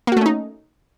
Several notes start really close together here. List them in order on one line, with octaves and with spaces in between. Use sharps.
A#3 F#4 A3 C#4 D#4